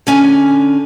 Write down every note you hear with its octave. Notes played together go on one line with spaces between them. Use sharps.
D3 C#4 G#5